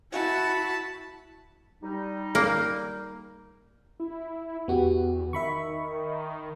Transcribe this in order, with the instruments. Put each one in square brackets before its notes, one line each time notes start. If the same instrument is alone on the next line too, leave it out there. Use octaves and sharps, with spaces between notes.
[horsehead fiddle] E4 F#4 [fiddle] A5 B5
[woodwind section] G3 D#4
[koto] A#3
[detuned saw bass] E4
[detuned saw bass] E2 [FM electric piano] B3 F#4 G4
[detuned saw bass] D#3 [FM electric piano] E5 B5 C#6